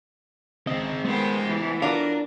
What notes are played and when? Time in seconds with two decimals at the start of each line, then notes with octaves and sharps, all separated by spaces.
0.67 C#2 D#3 C4 D#5
1.04 D#3 G#3 A3 B3 C5 G5
1.42 E3 B3
1.82 D4 F4 F#4 A4 A#4 C#5 F5